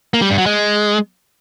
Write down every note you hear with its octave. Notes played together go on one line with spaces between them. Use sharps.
A#3
G3
G2
F#3
G#3